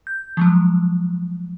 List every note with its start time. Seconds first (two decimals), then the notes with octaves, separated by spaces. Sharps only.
0.07 G6
0.37 F3 F#3 G#3